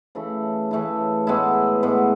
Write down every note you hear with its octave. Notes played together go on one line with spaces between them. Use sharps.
C#3 E3 A3 E4
C#3 E3 A3 E4
A2 G#3 B3 E4
A2 G#3 B3 E4